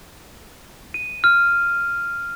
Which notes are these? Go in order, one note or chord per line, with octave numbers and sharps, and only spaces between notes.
D#7
F6